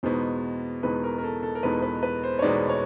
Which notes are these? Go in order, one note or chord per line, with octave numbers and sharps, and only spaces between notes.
E2 B2 G#3 B3 D#4 C5
E2 B2 G#3 B3 D#4 B4
A#4
A#4
A4
A4
A#4
E2 B2 G#3 B3 D#4 B4
B4
B4
C5
C#5
E2 B2 G#3 B3 D#4 D5
C#5